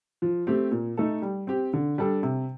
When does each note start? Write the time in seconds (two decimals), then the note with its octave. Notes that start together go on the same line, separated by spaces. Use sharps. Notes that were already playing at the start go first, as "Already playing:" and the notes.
0.22 F3
0.47 A3 C4 G4
0.71 A#2
0.97 A3 D#4 A4
1.22 G3
1.47 C4 G4
1.73 D3
1.98 G3 D4 A4
2.23 C3